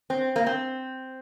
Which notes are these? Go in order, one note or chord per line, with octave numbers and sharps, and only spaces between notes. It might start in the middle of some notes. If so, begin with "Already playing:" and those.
C4
A#3
C4